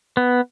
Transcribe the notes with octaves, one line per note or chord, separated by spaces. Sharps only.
B3